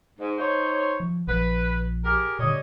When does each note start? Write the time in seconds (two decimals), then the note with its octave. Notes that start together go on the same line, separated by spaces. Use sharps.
0.19 G#2
0.38 D#4 C5 C#5
1.00 F3
1.27 A#1 F3 B4
2.05 G4 G#4 A#4
2.39 A#2 D3 G3 C#5 D#5